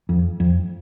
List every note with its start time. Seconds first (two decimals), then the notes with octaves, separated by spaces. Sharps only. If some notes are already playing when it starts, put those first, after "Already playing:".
0.09 F2
0.40 F2